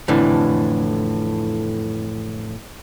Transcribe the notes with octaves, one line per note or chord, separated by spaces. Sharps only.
F2 A2 D3 E3